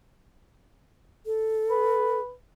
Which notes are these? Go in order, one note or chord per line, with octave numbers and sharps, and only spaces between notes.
A4
B4